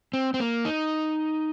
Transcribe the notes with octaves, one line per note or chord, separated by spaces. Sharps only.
C4
C4
A#3
D#4